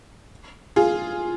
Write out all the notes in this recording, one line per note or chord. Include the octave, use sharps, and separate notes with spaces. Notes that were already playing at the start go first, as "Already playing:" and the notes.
F4 G#4